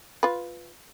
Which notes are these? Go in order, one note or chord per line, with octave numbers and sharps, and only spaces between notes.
F4 B4